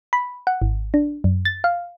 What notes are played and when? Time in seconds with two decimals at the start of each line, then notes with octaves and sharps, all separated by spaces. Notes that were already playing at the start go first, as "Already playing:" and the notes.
0.13 B5
0.47 F#5
0.62 G#1
0.94 D4
1.24 F#2
1.45 A6
1.64 F5